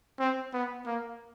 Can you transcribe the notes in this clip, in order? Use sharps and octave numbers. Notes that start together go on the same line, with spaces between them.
C4
B3
A#3